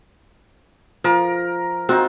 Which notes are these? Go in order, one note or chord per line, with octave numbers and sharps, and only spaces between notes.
F3 A#4
C4 D#4 F4 F#4